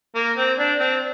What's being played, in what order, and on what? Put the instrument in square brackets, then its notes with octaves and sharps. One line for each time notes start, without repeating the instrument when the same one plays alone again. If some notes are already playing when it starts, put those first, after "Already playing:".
[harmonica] A#3
C4
D4
C4